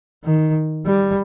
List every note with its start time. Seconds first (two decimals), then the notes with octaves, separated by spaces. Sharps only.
0.25 D#3
0.86 G3